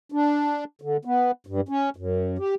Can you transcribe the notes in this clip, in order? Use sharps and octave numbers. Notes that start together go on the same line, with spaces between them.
D4
D3
B3
G2
C#4
F#2
G4